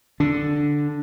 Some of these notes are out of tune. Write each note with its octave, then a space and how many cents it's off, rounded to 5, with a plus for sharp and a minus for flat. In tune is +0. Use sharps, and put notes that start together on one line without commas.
D3 +0 D4 +0